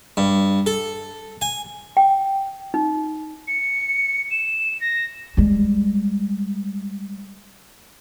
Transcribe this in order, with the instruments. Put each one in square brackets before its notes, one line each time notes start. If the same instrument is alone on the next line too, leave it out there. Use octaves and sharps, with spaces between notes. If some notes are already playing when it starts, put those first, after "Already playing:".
[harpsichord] G2
A4
G#5
[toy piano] G5
D#4
[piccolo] C#7
E7
A#6
[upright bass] G3 G#3